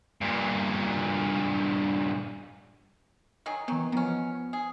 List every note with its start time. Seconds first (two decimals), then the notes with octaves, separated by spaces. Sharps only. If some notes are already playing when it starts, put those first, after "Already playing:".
0.21 G2 A#2
3.46 D#3 F#3 G#4
3.68 D#3 E3 F#3 B3
3.92 D#3 F3 B3 C#4
4.53 G#4